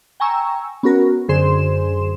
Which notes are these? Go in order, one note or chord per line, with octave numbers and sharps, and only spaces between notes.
G5 G#5 A#5 C#6 E6
B3 C#4 F#4 A#4
F#2 D3 G#4 C5 C6 E7